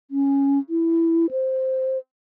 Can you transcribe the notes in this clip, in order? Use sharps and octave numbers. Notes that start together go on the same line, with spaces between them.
C#4
E4
C5